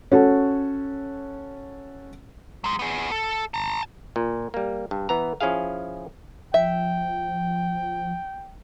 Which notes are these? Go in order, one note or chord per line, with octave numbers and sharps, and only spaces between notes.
C#4 F#4 A4
F#3 G#3
B3 G#4
A4
A5 A#5
A#2
G3 A#3
G2
E3 B3 A#5
F3 C#4 E4 G#4 F5
F3 E5 G5